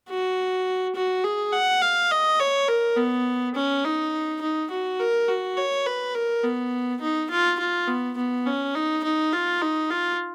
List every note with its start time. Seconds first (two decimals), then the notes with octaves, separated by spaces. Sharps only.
0.09 F#4
0.95 F#4
1.24 G#4
1.53 F#5
1.82 F5
2.11 D#5
2.40 C#5
2.68 A#4
2.97 B3
3.55 C#4
3.84 D#4
4.41 D#4
4.71 F#4
5.00 A#4
5.28 F#4
5.57 C#5
5.86 B4
6.15 A#4
6.44 B3
7.01 D#4
7.30 F4
7.59 F4
7.88 B3
8.17 B3
8.46 C#4
8.75 D#4
9.04 D#4
9.33 F4
9.62 D#4
9.90 F4